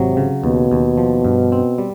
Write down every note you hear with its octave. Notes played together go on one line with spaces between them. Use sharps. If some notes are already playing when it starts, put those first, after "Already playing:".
Already playing: G#1 C3 F#3
C#3
D#2 B2
D#2
F3
G2
C4
G3